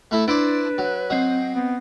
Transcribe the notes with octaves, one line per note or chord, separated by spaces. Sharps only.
A3 E4 A4
D4 E4 B4 C5 D5
F#3
F#3 C4 D#5
B3